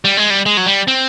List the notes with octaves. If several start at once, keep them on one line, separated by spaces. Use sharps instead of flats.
G3
G#3
G3
G#3
F#3
G3
C4